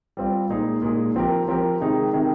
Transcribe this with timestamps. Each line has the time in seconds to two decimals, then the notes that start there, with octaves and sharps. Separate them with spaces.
0.17 G3 C4 F4
0.49 A#2 G#3 D#4 G#4
0.82 A#2 G#3 D#4 G#4
1.16 F3 C4 G4 A#4
1.48 F3 C4 G4 A#4
1.81 C3 D#3 G#3 D#4 G#4
2.13 C3 D#3 G#3 D#4 G#4